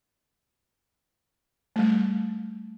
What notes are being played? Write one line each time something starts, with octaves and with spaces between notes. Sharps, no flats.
G3 A3